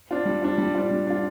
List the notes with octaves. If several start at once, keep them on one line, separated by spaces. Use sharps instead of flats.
D4 F4
G3
D4 F4
G3
D4 F4
G3
D4 F4